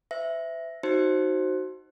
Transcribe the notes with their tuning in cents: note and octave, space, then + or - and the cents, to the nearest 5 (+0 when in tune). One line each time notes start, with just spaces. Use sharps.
C5 -45 E5 +0
D#4 +0 F#4 +5 C5 +10